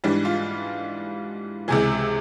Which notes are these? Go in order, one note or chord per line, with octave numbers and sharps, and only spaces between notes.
G#2 E3 G3 D4
F4
C#2 C3 E3 G#4